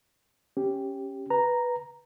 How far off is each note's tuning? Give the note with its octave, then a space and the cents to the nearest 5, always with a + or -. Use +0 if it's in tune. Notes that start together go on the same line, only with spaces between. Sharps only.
C#4 -10 G4 +0
B4 -5 A#5 +0